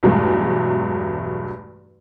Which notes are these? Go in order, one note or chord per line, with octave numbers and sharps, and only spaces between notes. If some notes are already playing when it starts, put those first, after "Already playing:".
B1 E2 G2 F#3 G#3 A3